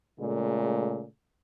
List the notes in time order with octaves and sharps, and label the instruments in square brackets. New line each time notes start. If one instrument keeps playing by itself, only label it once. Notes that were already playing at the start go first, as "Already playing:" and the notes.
[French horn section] A#2 C#3 G#3 A3